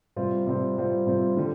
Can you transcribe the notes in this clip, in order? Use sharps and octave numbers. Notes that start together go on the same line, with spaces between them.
C3 G3 C4 F4
C3 G3 C4 F4
C3 G3 C4 F4
C3 G3 C4 F4
D3 G3